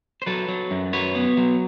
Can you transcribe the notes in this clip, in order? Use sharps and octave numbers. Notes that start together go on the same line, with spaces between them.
C5
F#3 A4 B4
F#3
F#2
F#3 B4 C#5
B3
F#3